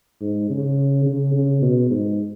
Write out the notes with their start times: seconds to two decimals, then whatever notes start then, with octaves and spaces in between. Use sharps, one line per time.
0.21 G#2
0.50 C#3
1.06 C#3
1.34 C#3
1.62 B2
1.91 G#2